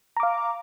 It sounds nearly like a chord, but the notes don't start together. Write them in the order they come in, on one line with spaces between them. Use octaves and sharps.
A#5 D6 F5